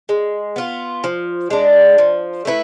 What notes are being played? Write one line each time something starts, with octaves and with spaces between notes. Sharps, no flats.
G#3
B3 F4
F3
G#3 D4
F3
A3 E4 B4